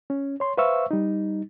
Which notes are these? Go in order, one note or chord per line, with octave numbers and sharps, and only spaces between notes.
C#4
C#5 C6
B4 C5 E5 F5 C#6 E6
G3 D#4